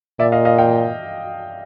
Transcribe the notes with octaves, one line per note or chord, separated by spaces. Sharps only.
A#2 D5 E5
D#5 F5
D#5 F5
F5 G5